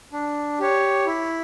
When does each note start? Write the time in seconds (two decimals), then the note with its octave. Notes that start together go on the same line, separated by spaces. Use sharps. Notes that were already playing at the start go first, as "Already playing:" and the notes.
0.13 D4
0.59 G4 C#5
1.06 E4